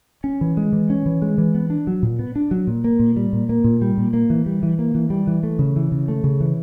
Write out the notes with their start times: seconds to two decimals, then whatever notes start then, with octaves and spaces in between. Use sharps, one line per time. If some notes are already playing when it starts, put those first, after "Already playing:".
0.24 C#4
0.41 E3
0.57 G#3
0.73 E3
0.90 C#4
1.06 E3
1.22 G#3
1.38 E3
1.55 B3
1.70 D4
1.87 F#3
2.03 A#2
2.19 B3
2.36 D4
2.51 F#3
2.67 A#2
2.84 A#3
2.99 A#2
3.16 G3
3.33 A#2
3.49 A#3
3.64 A#2
3.82 G3
3.97 A#2
4.13 A#3
4.30 E3
4.46 G3
4.63 E3
4.79 A#3
4.95 E3
5.10 G3
5.27 E3
5.43 A3
5.59 C#3
5.76 E3
5.92 C#3
6.08 A3
6.24 C#3
6.40 E3